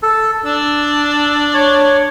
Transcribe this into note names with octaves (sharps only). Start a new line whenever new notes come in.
A4
D4 E6
C#5